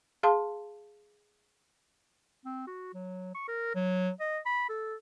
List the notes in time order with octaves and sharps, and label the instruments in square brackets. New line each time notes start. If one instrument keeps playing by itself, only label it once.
[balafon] G#4 F5 A5 C6
[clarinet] C4
F#4
F#3
C#6
A#4
F#3
D#5
B5
A4